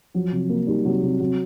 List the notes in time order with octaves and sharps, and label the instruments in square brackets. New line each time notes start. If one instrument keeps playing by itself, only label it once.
[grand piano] F3 [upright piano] F#3
[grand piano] C3
A#3
[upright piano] G3 [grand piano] D#4
[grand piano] C3 [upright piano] F#3
[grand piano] C3 [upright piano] G3
[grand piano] C3 [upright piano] F#3